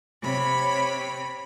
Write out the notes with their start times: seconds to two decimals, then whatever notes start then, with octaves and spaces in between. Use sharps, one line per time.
0.22 C3 C#5 B5